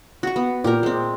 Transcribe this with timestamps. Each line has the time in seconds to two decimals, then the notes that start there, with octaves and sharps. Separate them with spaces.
0.23 F#4 C#6
0.36 B3
0.64 A#2 G4 A#4
0.83 G#3 C4